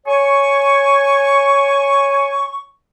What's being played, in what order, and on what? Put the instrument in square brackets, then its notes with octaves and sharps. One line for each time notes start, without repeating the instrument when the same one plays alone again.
[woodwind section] C#5 G#5 C#6